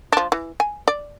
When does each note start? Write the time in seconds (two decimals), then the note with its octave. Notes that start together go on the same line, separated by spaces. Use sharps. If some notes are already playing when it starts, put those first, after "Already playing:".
0.13 F3 D4
0.32 E3
0.60 G#5
0.88 D5